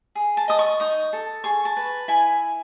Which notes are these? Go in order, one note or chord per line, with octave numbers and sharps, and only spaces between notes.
G#4
A5
D#5 D#6
C#6
D#4 D#6
A4
G#4 C#6
A5
B4
E4 G#5